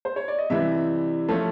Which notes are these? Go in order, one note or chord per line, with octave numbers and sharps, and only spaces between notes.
C5
C#5
D5
D#5
C3 E3 G3 E5
F3 A3 C#4